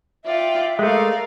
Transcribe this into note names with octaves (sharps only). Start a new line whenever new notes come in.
F4 D5 E5 G5
G#3 A3 A#4 D5 F5